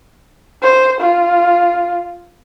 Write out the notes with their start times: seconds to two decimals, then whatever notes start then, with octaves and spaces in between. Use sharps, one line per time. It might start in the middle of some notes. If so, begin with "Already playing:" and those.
0.62 C5
1.01 F4